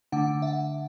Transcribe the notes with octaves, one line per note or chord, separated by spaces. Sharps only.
D3 A3 D4 F#5
E5
F#5